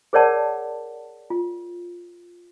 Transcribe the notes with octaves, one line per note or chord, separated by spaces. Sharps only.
G#4 A#4 C#5 D5 F#5 A5
F4